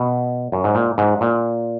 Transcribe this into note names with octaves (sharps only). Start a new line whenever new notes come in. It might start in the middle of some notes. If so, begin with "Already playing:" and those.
Already playing: B2
F#2
G#2
A#2
G#2
A#2